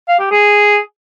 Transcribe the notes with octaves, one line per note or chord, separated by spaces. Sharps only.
F5
G4
G#4